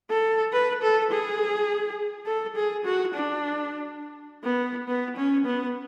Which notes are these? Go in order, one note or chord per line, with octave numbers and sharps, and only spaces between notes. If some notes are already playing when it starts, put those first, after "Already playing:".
A4
B4
A4
G#4
A4
G#4
F#4
D4
B3
B3
C#4
B3